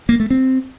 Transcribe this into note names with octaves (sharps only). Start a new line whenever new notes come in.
A#3
A3
C4